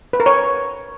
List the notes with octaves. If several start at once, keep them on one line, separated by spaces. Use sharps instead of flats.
B4
A#4
C#5